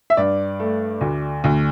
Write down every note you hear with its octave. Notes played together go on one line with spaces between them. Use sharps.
E5
G2 D5
A3
D2
D2